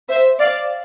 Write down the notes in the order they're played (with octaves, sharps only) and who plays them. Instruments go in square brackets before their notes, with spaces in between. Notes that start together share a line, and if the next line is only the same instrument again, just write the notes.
[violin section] C5 E5
D5 F5